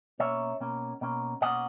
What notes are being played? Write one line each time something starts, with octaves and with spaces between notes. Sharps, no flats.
B2 A#3 C#4 C#5 E5
B2 A#3 C#4
B2 A#3 C#4
B2 A#3 C#4 D#5 F#5